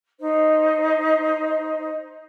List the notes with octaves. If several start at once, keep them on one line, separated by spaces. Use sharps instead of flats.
D#4 C5 D#5